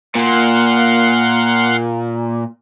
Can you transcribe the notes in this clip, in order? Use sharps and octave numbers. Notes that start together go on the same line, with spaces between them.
A#2 F5 F#5 C6